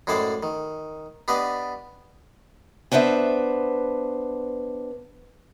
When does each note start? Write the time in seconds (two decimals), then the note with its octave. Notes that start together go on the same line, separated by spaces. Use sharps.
0.07 F#2 A2 G#3 C5 D5 G5
0.43 D#3
1.28 B3 D4 G4 D5 D#5
2.92 B3 D4 B4 C5 E5